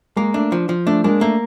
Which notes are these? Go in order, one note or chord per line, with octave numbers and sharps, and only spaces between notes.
G#3 A#3
A3 D4
F3
F3
A3 D4
G#3 A#3 D4
A3 A#3